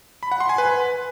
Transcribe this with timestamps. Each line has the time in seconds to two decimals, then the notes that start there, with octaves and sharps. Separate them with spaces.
0.23 B5
0.32 F#5
0.40 C6
0.49 G#5
0.58 B4